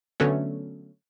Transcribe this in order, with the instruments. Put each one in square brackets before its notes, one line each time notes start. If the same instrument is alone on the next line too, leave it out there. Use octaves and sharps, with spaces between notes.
[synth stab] D3 F#3 A3 B3 C#4